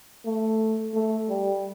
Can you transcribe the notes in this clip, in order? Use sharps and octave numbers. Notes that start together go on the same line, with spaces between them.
A3
A3
G3